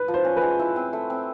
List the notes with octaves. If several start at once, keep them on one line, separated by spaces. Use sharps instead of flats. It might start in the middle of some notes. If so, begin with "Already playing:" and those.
Already playing: B4
F3
C5
C#4
B4
G#3
E4
C4
A3
C4